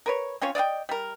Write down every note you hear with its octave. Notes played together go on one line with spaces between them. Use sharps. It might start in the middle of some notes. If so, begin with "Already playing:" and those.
A#4 B4 C#5
C4 C#4 F4 C#5
D5 D#5 F5 G5
G3 A#4